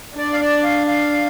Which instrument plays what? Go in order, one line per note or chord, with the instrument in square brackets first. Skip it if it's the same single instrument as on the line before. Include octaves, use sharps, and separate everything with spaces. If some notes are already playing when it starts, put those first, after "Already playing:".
[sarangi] D4 [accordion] D5
[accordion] F5
D5
F5
F5